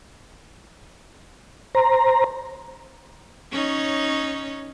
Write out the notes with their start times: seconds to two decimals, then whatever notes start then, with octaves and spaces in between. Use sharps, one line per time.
1.75 C5 A#5
3.51 C#4 D#4 C#5